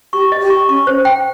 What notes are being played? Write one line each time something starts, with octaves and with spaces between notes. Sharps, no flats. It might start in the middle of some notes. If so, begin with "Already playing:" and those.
G4 C#6
D#5
G4
C#6
C#4 C#6
C5
G5